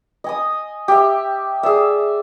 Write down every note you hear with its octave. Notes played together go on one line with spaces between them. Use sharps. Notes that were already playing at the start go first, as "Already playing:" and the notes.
D#5 G#5 D#6
G4 E5
G#4 D5 E5